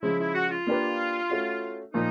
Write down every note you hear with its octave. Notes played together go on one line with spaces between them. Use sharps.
C#3 F3 G#3 E4
E4
F#4
F4
A#3 D4 G4 B4
A3 C#4 F#4
A#2 F3 A#3 D#4